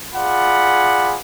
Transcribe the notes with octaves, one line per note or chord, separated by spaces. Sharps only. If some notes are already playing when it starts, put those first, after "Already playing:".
F4 G#4 D5 F#5 B5